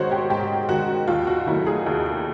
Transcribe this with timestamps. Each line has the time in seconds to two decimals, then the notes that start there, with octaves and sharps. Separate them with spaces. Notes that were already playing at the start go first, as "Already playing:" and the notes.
Already playing: G#2 D#3 G#3 F#4 C5 C#5
0.12 G4
0.30 G#2 G4
0.69 D#3 G#3 F#4
1.08 D#2 F4
1.27 F#4
1.46 D#3 F#3 A3 E4
1.67 G#4
1.86 D#2